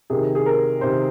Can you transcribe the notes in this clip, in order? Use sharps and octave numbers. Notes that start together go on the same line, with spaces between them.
C3 D#3 G#4
G#4
A#4
C3 D#3 C5